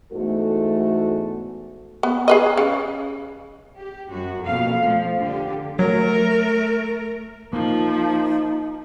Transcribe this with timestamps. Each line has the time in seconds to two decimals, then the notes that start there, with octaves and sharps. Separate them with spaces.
0.12 E2 G#2 A3 F#4 A4
2.03 B3
2.28 G#4 B4 D#5
2.57 C#3
3.78 G4
4.11 F#2 F#4
4.45 F2 B2 A#3 F5
4.82 F3 A3
5.18 D3 G4
5.79 F#3 A3 A#4
7.53 F3 A#3 D#4